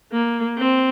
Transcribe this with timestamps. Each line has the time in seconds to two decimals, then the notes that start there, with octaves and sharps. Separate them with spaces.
0.13 A#3
0.58 C4